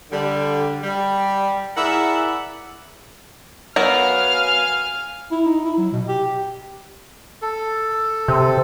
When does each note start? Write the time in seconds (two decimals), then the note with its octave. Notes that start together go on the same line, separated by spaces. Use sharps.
0.12 D3 G3
0.83 G3
1.77 E4 G#4 A#4 D5 E5 F#5
3.76 F#3 B3 A#4 F5 G#5 F6
5.31 E4
5.46 D#4
5.65 E4
5.78 F#3
5.92 B2
6.08 G4
7.42 A4
8.28 C3